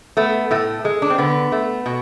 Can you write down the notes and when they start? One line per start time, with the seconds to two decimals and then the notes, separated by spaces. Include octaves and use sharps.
0.17 A3 B3
0.51 A2 A3
0.85 G#3
1.02 D4
1.10 C4
1.18 D3 B3
1.52 A3
1.86 B2